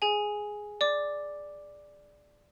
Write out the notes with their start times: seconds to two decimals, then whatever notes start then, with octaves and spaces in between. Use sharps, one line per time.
0.02 G#4 G#5
0.81 D5 D6